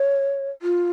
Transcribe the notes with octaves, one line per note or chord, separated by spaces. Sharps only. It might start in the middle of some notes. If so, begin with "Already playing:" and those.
Already playing: C#5
F4